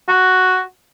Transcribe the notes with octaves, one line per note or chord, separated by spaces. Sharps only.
F#4